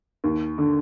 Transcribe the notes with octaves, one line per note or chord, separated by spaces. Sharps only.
D#2
D3